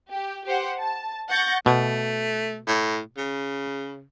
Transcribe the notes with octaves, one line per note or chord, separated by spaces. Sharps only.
G4
G4 C5 F#5
A5
F#5 C#6 G6 A6 A#6
B2 A3
A2
C#3